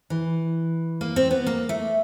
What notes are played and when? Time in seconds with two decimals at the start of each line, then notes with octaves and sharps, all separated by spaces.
0.10 E3
1.01 A#3
1.16 C4
1.31 B3
1.47 A#3
1.69 A3